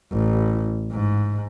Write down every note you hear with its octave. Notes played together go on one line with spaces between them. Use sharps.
A1
G#2